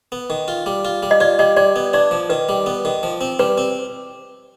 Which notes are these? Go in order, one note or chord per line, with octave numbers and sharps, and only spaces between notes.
B3
D#3
F4
G3
F4
G3
D#5
F4 D5
G3 D#5
G3 D5
B3
D4 D5
F3
D#3 B4
G3
B3
D#3
F3
C4
G3 B4
C4